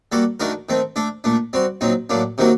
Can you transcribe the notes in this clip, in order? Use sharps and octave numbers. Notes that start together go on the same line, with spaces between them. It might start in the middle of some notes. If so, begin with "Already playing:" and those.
G3 A#3 F#4 A4
D#3 A3 D4 F#4 A#4
D#3 A3 C4
A3 D4 A4
A#2 A3 D4
G3 C4 F#4
A#2 F#3 C4 D#4
A2 F#3 A#3 D4
C3 D#3 F#3 A#3 F#4